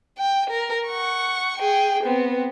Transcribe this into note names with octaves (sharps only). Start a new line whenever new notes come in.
G5
A#4
F#5 C#6
G#4 G5
B3 C4